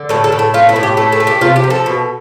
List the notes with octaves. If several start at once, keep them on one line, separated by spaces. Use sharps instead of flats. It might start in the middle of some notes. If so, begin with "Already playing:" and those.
Already playing: D3
A2 A4
A4
A2
A4
A3 F4
E4
A2
G4
A3 A4
A4
A3
G4
C3 F4
G4
F3
A4
B2